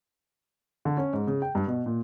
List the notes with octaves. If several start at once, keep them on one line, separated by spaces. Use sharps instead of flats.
D3
C#4
G#2
C#3
G5
G2
B2
A#2